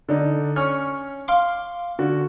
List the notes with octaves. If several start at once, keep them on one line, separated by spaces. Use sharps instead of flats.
D3 D4 D#4
C#4 C#6 F6
F5 C6 D6
D3 F#4